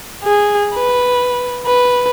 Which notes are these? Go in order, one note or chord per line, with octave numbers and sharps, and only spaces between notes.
G#4
B4
B4